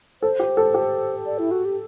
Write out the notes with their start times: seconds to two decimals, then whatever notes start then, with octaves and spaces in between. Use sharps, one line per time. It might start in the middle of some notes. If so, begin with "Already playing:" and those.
0.22 A4 C5
0.40 G4
0.57 A4
0.74 G4
1.26 D5
1.39 E4
1.51 F#4
1.65 G4